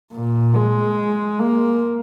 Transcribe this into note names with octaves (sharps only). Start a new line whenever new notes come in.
A#2
G#3
A#3